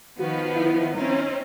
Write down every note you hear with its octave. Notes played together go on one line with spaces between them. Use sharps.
D#3 F3 B3 F#4
E4
C4 C#4 D#4